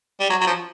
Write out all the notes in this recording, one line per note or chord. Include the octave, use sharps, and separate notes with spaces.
G3
F#3
F#3
F3